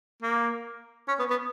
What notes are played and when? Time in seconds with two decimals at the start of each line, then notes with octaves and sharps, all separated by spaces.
0.23 A#3
1.08 C#4
1.19 B3
1.30 B3